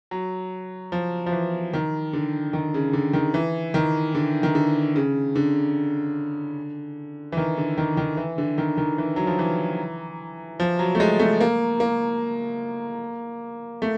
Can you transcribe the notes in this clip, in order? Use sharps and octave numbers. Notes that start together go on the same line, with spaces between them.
F#3
F3
F3
E3
D#3
D3
D#3
C#3
D3
D#3
E3
D#3
D3
D#3
D3
C#3
D3
E3
D#3
D3
D#3
D#3
E3
D3
D#3
D#3
E3
F#3
F3
E3
F3
F#3
A3
G#3
A3
A#3
A#3
A3